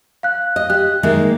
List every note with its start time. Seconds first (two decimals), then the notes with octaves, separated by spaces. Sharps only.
0.23 F5 F#6
0.56 D#5
0.70 G4 F#6
1.03 D#3 G#3 A#3 E5